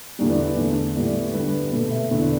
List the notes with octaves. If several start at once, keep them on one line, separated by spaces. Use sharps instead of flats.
E2 D3 G3 B3 D5
B4
D5
E2 D3 A3
A2 G3 B3 D5
G2 D3 G3 B4
B2 A3 B4
E5
E2 D3 B3 B4
D5